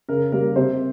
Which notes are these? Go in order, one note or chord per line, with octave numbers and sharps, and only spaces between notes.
C#3 A#4
G3 A#3 A#4
C3 C5